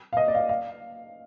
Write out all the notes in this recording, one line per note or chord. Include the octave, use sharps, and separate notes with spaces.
F5
D#5
D5
F5
D#5
F5